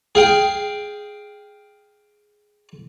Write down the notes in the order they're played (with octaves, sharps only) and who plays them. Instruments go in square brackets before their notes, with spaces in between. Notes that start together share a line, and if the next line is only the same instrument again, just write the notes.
[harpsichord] G#4 F5 G5